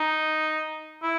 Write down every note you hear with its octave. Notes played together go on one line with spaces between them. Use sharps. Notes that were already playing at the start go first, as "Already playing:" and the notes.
Already playing: D#4
E4